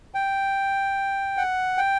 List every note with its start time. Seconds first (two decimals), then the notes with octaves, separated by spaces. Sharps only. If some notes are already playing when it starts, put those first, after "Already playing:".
0.14 G5
1.37 F#5
1.78 G5